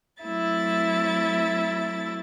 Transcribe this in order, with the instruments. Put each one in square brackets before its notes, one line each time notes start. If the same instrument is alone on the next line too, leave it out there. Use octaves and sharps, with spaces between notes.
[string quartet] F#3 A3 C4 E4 E5 A6